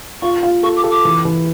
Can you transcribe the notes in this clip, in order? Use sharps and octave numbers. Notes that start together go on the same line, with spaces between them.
F4 C#6
F4
A4 C#6
D6
A4
D6
E3
E3